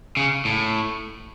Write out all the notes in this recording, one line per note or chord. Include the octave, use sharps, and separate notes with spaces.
C#3
A2